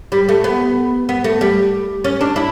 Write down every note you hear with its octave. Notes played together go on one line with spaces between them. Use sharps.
G3
A3
B3
B3
A3
G3
C#4
D4
E4